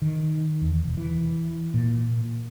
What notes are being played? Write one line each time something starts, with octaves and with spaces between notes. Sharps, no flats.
D#3
E2
E1
E3
A#2